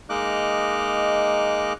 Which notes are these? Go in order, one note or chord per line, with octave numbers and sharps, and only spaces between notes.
G#3 A#3 D#4 D#5 D6 F#6